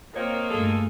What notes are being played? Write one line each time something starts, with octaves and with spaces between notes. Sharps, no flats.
A#3 C4 F4 A#4 C#5 D#5
G2 A3 G#4 A4